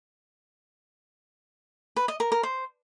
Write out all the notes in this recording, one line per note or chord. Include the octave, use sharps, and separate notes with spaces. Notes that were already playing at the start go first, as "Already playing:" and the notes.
B4
D#5
A#4
A#4
C5